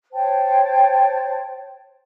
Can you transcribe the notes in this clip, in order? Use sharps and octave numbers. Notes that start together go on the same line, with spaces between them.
C5 C#5 G5 A5